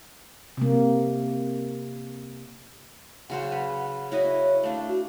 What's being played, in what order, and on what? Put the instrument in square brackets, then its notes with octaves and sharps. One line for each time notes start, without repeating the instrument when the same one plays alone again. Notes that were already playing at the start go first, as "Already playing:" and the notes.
[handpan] C3 A#3
[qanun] C#3 F#3 C5 [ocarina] F#5
[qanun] B4
[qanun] E4 F#4 D#5 [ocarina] C#5
[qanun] A3 D4 [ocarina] F5
[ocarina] F#4